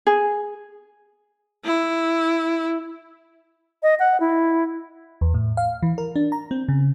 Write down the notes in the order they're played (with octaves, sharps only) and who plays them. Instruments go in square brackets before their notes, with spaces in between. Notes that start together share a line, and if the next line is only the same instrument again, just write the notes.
[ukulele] G#4
[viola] E4
[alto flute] D#5
F#5
E4
[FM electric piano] E2
A2
F5
E3
A#4
D4
A#5
C4
C#3